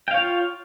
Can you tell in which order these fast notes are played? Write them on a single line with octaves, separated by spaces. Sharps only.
G5 F5 C#5 F4